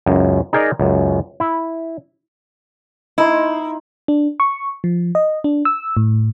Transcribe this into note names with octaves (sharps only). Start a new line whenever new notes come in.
C#2 F#2
D#4 G#4 A#4 D5 D#5
C#2 F#2
E4
D#4 E4 C6
D4
C#6
F3
D#5
D4
E6
A2